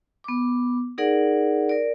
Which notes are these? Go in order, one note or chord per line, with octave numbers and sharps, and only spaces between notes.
B3 D6
D#4 G#4 A#4 D5 F#5
A#4 D5